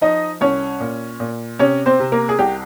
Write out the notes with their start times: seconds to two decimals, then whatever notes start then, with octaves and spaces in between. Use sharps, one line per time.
0.01 F3 D#4 D#5
0.41 C2 C#4 C#5
0.80 A#2
1.20 A#2
1.59 C3 C#4 C#5
1.86 C4 C5
2.00 C3
2.12 A#3 A#4
2.29 G#4
2.39 C2 G4